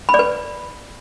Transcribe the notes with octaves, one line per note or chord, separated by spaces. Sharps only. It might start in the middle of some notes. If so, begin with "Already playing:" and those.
B5
D5
B4